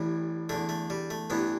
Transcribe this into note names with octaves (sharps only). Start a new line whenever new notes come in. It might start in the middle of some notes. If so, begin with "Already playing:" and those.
Already playing: A1 A2 E3 G3
E2 D3 A3
A3
G3
A3
A1 G2 E3 B3